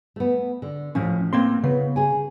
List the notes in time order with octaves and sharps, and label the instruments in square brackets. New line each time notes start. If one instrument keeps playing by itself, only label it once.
[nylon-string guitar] A3 B3
D3
[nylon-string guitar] A2 [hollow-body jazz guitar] F3 C#4
[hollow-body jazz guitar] A#3 C4 C6
[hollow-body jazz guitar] C#3 [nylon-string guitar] B3
[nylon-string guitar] G#4 G#5